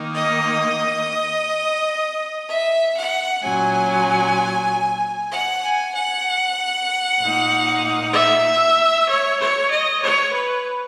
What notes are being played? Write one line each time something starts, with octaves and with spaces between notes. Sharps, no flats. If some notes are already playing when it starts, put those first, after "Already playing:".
Already playing: D#3 A#3 D#4
D#5
E5
F#5
A#2 F#3 C#4 G#5
F#5
G#5
F#5
A#2 A#3 D#4
E5
C#5
C#5
D#5
C#5
B4